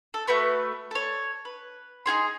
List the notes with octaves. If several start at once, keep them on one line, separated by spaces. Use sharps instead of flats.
A4
A3 F#4 B4 C#6
A4 C#5
B4
D#4 F4 G#4 C6